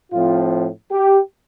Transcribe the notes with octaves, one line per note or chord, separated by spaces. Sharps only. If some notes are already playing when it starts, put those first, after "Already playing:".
A2 F3 C4 F4
G4